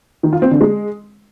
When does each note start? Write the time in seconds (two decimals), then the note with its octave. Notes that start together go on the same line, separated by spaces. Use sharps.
0.23 D#3
0.33 F4
0.42 C4
0.51 D3
0.61 G#3